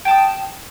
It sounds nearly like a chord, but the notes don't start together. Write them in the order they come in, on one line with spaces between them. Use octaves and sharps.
G5 A5 D#6